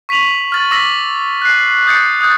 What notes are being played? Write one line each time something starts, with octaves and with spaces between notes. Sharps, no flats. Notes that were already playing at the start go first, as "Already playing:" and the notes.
C#6 B6 D#7 F7 F#7
F6 A6 F#7
D6 E6 A#6 B6 F#7
F#6 C7
D#6 G6 A6 C7 C#7
D#6 F#6 G6 A6